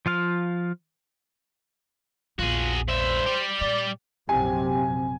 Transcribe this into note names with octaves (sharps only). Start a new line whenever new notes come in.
F3 F4 F5
A#1 E2 F4 F#4 G#4
G2 C5 E5
G3 G4
A#2 D5
A#1 F#2 C3 C4 G4 G#5